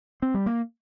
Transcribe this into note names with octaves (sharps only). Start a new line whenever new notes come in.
C4
G3
A#3